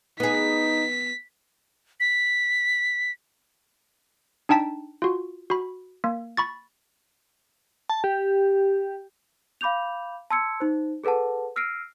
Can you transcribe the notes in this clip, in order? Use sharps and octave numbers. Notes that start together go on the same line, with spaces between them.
B3 D#4 G#4 B6
B6
D4 D#4 G5 A5 B6
F4 F#4
F#4 B5
A#3
B5 C#6 A6
A5
G4
F5 B5 D6 G6 F7
A5 C6 E6 G#6 C#7
D#4 C5
G#4 A4 B4 F#5 A5
E6 F6 A#6 C7 D7 D#7